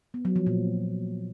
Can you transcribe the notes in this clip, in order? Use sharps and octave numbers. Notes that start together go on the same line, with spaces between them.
B3
F#3
F3
A#2